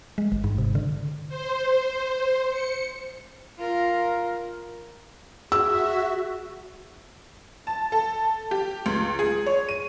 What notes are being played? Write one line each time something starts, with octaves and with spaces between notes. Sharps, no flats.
G#3
G#1
G#2
C3
D3
C5
C#7
F4 A#4
F#4 G#4 E5 E6
A5
A4
G4
C#2
G#4
C#5
D#7